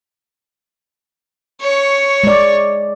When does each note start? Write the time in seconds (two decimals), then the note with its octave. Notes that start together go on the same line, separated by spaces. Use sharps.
1.60 C#5 C#6
2.24 G#3 D5